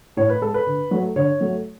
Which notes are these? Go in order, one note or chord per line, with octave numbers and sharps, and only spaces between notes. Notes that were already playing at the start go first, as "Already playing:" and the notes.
A2 C#5
B4
G#3 A4
B4
D3
F#3 A3
D3 C#5
F#3 A3